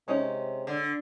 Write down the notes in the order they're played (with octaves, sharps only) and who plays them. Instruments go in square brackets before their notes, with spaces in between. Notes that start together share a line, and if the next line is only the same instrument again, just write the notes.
[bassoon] C3 [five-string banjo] G#3 C#4 D#4
[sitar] D3